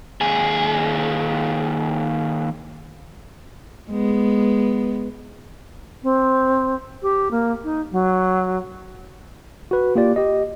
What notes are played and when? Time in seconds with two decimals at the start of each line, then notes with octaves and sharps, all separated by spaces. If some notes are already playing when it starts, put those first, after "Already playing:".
0.21 D#2 G#4
3.91 G#3 B3
6.03 C4
7.02 G4
7.31 A#3
7.64 D#4
7.92 F#3
9.71 F#4 B4
9.96 A#3 F4 G4 D5
10.16 G4 D#5